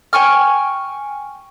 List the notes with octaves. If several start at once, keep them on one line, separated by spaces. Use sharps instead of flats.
G5 G#5 C#6 F6